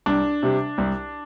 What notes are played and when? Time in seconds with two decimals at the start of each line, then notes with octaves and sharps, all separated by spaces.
0.06 C2 D4
0.43 C3 G3
0.78 C2